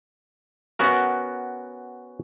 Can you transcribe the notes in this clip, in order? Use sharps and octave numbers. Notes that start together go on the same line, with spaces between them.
B3 C#4 F#4 A#4